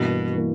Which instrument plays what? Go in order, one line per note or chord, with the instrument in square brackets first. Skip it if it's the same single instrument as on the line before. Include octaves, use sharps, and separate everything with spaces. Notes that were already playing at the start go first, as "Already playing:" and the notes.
Already playing: [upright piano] G2 E3 A#3 [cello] B2
[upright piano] E3 A#3